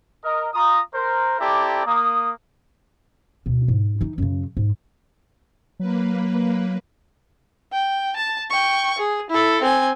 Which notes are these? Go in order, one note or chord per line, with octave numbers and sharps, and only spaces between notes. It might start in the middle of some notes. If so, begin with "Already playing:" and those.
A#4 D#5
F4 A#5 D#6
A#4 C5
C4 E4 G4 A4 D5 A#5
A#3 D#6
D2 B2
G#2
E3 D#4
F#2 C#3
G#2
F#3 A#3 B4
G5
A5
G5 C#6
G#4
E4 A4
C4 G#5